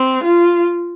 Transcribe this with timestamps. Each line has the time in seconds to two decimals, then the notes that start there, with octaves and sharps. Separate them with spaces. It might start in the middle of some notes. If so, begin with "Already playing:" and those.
Already playing: C4
0.24 F4